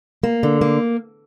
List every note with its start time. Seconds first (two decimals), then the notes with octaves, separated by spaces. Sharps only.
0.23 A#3
0.43 D3
0.61 A#3